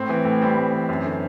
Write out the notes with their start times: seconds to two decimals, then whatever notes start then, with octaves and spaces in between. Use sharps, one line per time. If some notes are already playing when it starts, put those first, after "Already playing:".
Already playing: A2 C4
0.09 E3
0.25 A2
0.41 G3 C4
0.57 A2
0.73 E3
0.89 F#2
1.04 D3